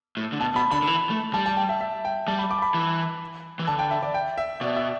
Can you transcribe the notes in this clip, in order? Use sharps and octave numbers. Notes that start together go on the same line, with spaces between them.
A2
D3
B2 A5
B2 B5
D3 B5
D3
E3
A3
G3 A5
A5
G5
E5
E5
G5
G3 A5
B5
D6
A5
B5
E3
E3
D3 A5
G5
E5
D5
G5
E5
B2 D5
E5